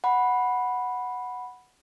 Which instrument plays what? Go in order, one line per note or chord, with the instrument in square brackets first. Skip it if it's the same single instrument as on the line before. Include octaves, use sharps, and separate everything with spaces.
[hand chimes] F#5 B5